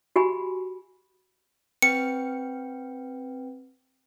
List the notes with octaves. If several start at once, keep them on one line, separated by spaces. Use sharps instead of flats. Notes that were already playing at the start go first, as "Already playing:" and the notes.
F#4 G4 G#5 B5
C4 B4 G5 C#7